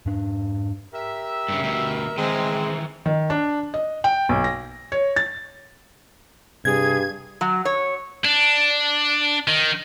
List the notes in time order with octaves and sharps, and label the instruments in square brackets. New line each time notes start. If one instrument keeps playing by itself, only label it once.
[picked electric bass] G#2 D4
[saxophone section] G4 A#4 E5
[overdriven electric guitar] G2 C#3
D2 B2
[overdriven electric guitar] D#3 E3 [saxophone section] G#3 C4
[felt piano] D#3
D4
D#5
G5
B1
A#6
C#5
A6
[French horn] G2 [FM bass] C3 [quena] G#4 [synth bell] G#6
[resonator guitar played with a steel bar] F#3
C#5
[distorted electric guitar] D4
D#3